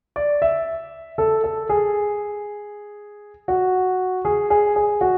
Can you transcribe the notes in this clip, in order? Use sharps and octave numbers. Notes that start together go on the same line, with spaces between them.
D5
E5
A4
A4
G#4
F#4
G#4
G#4
G#4
F#4